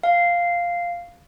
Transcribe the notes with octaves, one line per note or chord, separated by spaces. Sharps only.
F5